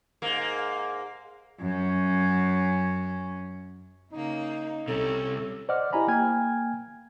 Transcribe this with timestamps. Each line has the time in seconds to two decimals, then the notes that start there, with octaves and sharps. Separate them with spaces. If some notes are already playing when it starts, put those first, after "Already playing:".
0.22 G#2 A#3
1.60 F#2 C#4
4.12 C#3 A#3 D#4
4.88 C2 C3 C#4 A4
5.69 C5 D5 D#5 F#5 D6 F6
5.93 E4 G4 D#5 G#5 A#5 B5
6.08 A#3 G5 G#5 F6 G#6